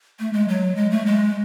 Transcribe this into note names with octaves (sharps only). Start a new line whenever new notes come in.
A3
G#3
F#3
G#3
A3
G#3